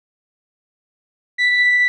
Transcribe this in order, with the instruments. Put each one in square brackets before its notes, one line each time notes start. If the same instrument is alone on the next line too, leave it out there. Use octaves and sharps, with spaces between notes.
[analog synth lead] B6